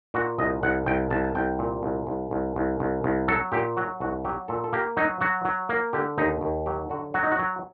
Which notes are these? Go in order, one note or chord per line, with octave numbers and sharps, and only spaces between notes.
A#2 F#4
C2 D#5
C2 F#5
C2 G5
C2 A5
A5
C2 G5
A#2
C2
C2
C2
C2
C2
C2
F#3 A4
A#2 G4
F#3 F#4
C2 F#4
F#3 G4
A#2 A4
A4
A#3 G4
F#3 D#4
F#3 F#4
F#3
A#3
D3 G4
D#2 D#4
D#2
F#3 G4
D3 F#4
F#3 F#4
D#4
F#4
F#3